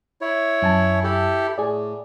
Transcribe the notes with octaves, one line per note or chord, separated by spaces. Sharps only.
E4 C#5
F#2 G#5 A5
E4 G4 A4
A2 G#4 D5